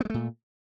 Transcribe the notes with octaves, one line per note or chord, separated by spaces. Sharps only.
A#2 G#3 A3 B3